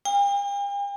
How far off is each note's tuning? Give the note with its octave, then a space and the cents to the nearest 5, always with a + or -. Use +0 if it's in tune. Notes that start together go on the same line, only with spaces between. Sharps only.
G5 +45